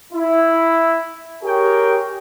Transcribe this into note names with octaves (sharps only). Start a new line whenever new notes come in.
E4
G4 G#4 A#4 C#5 G5